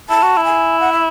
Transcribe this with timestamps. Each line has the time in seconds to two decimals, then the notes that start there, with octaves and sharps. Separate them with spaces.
0.09 E4 A5
0.23 F#4
0.37 E4
0.45 G#5
0.80 F#5
0.92 E5